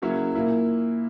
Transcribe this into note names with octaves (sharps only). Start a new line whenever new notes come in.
C#3 F#3 A#3 C#4 E4
A#2 A#3 E4